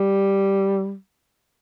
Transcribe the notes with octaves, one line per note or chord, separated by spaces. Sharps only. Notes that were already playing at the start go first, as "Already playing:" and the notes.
Already playing: G3